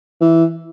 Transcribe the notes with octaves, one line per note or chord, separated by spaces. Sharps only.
E3